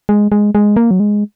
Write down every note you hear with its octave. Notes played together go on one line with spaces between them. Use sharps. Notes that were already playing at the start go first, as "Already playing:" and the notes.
G#3
G#3
G#3
A#3
F#3
G#3